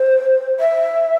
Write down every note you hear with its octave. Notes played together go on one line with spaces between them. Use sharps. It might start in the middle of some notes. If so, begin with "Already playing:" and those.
Already playing: C5
E5